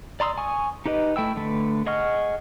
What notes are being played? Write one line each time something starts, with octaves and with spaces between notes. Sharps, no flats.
D5 A#5 C6 D#6 E6
G#5 C#6 D#6
D#4 G4 B4 D#5
A3 E4 G5 E6
D3 A3 B4
G#4 D#5 F#5 C#6 F6